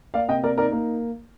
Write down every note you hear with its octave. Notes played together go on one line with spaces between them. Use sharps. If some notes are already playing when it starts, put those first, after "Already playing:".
A#3 D5 F5
C3 D#5 G5
A#3 A#4 D5
D#4 A#4 D5
A#3